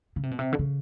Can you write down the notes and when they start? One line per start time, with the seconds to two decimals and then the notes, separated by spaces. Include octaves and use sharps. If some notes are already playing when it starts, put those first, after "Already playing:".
0.16 C#3
0.23 C3
0.31 B2
0.39 C3
0.52 D3
0.59 C#3